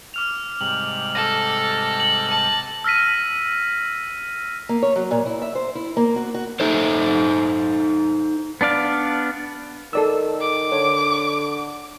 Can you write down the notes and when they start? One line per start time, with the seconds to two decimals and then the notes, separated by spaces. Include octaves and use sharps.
0.14 D6 F6 F7
0.61 G#2 C3 G3 F#7
1.15 A4 A#6 E7
1.51 C#7
2.00 F#7
2.30 A5
2.84 E6 F6 A#6 B6 D#7
4.69 A#3
4.82 C#5
4.96 F#3
5.11 A#2
5.26 E4
5.42 E5
5.55 C5
5.75 E4
5.97 A#3
6.16 F#4
6.34 F#4
6.60 D#4 A4 C5
8.61 B3 D4 D5 F5
9.93 D#3 A4 D5 E6
10.41 D6
10.72 D3 C#5